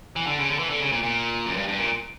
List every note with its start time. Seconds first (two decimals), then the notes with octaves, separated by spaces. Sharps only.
0.16 E3
0.27 D3
0.37 C#3
0.48 D3
0.59 E3
0.70 D3
0.81 C#3
0.92 A#2
1.03 A#2
1.46 F#2
1.57 G2
1.68 G2
1.78 A#2